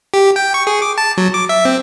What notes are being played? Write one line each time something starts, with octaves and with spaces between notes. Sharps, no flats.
G4
G5
C#6
G#4
D6
A5
F#3
D6
E5
C4